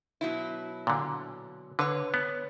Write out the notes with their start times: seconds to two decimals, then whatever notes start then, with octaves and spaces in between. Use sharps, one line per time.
0.21 B2 F#3 E4
0.87 A#2 D3
1.79 D3 B4 C#5
2.14 B3